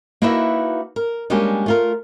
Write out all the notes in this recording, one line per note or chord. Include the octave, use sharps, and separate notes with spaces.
A#3 D#4 E4 F#4 B4 E5
A#4
G3 G#3 A#3 C#4 D4 G4
A3 F4 A#4